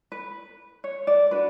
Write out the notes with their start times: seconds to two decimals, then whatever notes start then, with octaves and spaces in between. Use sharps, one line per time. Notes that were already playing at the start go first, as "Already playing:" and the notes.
0.12 B4
0.84 C#5
1.07 D5
1.31 D4 F#4 B4